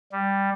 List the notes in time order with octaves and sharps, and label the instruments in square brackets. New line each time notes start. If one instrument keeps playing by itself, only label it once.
[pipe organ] G3